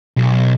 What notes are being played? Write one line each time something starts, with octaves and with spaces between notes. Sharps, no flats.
B1